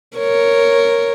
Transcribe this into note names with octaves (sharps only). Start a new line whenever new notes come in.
A#4 C#5